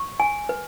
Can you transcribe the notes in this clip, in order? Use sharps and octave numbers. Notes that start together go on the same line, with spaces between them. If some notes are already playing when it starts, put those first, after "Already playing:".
Already playing: C#6
G#5
B4